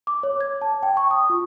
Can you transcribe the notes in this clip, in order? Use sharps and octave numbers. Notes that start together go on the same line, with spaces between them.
D6
C#5
G#6
A5
G5
C#6
D#6
F4